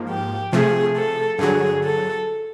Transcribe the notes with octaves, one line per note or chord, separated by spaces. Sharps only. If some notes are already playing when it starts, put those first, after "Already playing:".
Already playing: G#2 F3 A#3
G4
C3 F3 A3 G#4
A4
G2 D3 F#3 G#4
A4